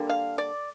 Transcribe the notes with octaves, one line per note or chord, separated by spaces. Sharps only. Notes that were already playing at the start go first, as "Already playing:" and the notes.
Already playing: D3 G3 A#3
F5
D5